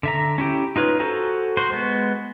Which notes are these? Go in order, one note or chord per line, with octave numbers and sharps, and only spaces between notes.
D3 E5 A#5
C#4 E4 G4
D#4 F4 B4 C#5
F#4 A4 C5 G#5 A#5
F#4 C5 C6
G#3 B3